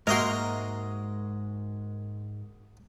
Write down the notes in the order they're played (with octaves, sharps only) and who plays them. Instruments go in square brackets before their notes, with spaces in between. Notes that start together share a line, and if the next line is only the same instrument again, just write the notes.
[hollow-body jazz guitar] G#2 A#3 [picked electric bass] G#3 [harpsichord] F#4 D#5 E5 [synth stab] A#4 C6